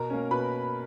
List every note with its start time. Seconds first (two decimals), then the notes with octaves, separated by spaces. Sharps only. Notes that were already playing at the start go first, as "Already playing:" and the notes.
Already playing: B2 A#4 A#5
0.10 A#3 C#4
0.31 B2 B4 B5